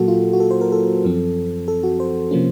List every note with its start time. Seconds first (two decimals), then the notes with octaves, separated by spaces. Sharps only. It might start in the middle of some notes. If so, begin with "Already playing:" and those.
Already playing: A#2 F#3 A#3 F#4 A4
0.08 F4
0.33 F#4
0.40 A4
0.51 C5
0.61 A#4
0.72 A4
1.04 F#2 F3 C4
1.68 A4
1.83 F#4
2.00 C5
2.31 C3 F3 A#3 C#4